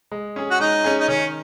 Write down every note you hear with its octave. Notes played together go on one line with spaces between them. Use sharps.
G#3
C#4 G#4
F#4
G#3 D#4
C#4 G#4
D#4
D#3 C#4